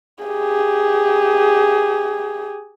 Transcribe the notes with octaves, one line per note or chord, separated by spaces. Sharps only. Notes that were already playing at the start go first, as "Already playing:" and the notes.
G4 G#4